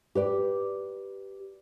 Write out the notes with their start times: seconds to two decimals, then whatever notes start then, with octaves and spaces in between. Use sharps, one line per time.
0.15 G4 B4 D5